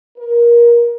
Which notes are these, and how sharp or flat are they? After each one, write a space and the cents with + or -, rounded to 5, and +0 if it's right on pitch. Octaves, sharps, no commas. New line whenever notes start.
A#4 +20